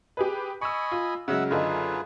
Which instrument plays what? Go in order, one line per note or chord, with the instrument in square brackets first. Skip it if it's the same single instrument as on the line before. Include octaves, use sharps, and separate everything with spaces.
[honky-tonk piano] G4 G#4 B4
[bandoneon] D#5 G#5 B5 [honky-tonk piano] C#6 E6
[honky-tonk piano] F4
[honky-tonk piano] C#3 F#3 G#3 [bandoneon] E5 F#5
[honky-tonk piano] F#2 D3 D#4 [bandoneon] F4 G#4 B4